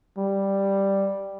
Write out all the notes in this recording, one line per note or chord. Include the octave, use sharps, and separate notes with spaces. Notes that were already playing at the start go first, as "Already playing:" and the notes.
G3